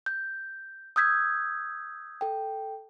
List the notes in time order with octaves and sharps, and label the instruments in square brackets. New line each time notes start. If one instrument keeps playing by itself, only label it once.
[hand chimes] G6
D#6 E6 G6 G#6 B6
A4 G5